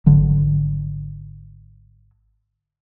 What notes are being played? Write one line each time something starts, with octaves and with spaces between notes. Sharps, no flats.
G#1 D3 F#3